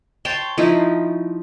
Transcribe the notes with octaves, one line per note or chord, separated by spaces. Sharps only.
C#5 G5 A5 C6
F3 D#4 E4